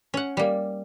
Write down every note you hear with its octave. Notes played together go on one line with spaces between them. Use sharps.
C#4 F#5
G3 A#3